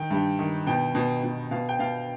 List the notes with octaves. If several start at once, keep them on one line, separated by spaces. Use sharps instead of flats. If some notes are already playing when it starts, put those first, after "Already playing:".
Already playing: D#3 G5
G2
D#3
B2 G5
B2
B2
B2 F5
G5
B2 F5